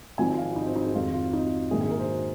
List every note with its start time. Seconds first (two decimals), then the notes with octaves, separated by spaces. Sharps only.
0.18 G#1 G#2 F3 G#3 G#5
0.38 F5
0.56 D#4
0.66 C4
0.76 D#4
0.85 G#4
0.95 F2 D#3 G#3 F4
1.14 F4
1.33 D#4
1.71 A#1 G#2 D#3 G#3 G#4
1.81 G#4
1.90 A#4
1.99 C5